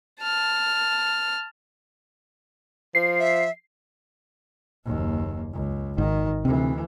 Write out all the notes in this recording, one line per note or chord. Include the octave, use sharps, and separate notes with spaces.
A5 F6
F3 C7
E5
F#1 D#2
C#2
G#1 D#3
D2 C3 E3